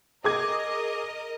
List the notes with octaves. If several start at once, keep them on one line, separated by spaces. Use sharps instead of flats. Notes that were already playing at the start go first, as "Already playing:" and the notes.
G#4 A#4 D#5 D6 G#6